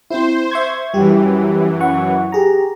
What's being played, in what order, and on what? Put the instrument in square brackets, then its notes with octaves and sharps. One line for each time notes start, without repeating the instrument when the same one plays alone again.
[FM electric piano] C4 E4 [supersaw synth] C5
[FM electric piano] E5 C#6 G#6
[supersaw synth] F#2 E3 [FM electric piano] G3 G4
[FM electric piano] F#5 C#6
G4 G#4 A#5